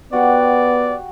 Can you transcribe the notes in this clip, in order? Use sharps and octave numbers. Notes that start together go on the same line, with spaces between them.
B3 F#4 G4 D5 F#5